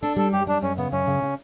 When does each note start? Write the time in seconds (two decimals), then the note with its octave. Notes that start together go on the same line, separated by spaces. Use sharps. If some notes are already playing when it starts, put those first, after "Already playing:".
0.02 D4 A4
0.17 G3 A4
0.33 F#2 G4
0.47 G3 D4
0.62 F#2 C#4
0.78 C#3 B3
0.92 F#2 C#4
1.07 C#3
1.22 C#3